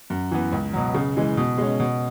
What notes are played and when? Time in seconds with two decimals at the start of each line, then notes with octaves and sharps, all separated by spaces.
0.10 F#2
0.31 E3 B3
0.52 C#2
0.73 B2 F#3
0.94 C#3
1.17 E3 G#3
1.37 B2
1.58 G#3 C#4
1.80 B2